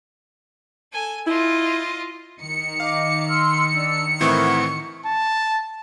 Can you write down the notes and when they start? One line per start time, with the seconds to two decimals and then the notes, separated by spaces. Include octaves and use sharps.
0.92 A4 G#5
1.27 E4 F4 D#5
2.41 D#3 C#7
2.80 D#5 F5 D6
3.28 C6 E6 F6
3.74 D4 E6
4.21 A2 E3 C4 E4 A#4 F#5 C#6
5.06 A5